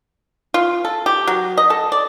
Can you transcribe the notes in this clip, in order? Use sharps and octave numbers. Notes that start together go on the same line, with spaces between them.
F4
A4
G4
F#3
D#5
A4
D5